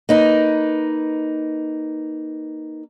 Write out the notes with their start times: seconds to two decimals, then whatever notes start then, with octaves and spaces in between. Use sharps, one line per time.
0.09 A#3 D#4 B4